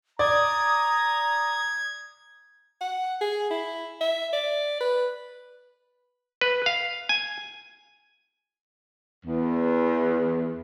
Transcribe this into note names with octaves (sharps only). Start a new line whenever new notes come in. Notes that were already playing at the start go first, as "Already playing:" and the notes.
D5 A#5 D#6 G#6
F#5
G#4
E4
E5
D5
B4
B4
F5
G#5
E2